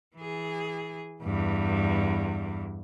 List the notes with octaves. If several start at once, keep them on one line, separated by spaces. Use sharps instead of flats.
E3 G#4
E2 G2